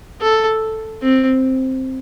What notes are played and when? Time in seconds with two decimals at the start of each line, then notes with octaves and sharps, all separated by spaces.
0.21 A4
1.02 C4